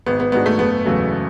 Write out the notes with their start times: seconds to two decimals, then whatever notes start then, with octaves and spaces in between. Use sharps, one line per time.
0.06 G#1 B3
0.20 B3
0.32 G#2 G#3 B3 D4 F#4
0.46 A3
0.58 F#1 B3
0.85 E2 C#3 F#3 A3